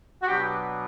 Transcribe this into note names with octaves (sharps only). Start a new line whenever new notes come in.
F#4
B2 F#3 B3 D4 G4